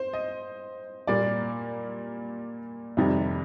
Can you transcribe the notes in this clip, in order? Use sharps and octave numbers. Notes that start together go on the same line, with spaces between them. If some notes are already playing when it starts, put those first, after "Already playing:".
Already playing: C5
D#5
A#2 G3 A#3 D5
F2 C3 D#3 G3